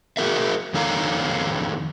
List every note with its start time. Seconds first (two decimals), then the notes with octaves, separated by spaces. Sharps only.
0.17 F#4 G#4 A#4 E5
0.74 F2 D#3 A4 C#5 F5 A#5